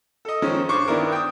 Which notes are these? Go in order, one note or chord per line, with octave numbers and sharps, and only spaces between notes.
A4 D#5
D#3 F3 G#3 C#4
G2 C5 C#6 D6
D#3 B3 D4 E4 A#4
G5 D#6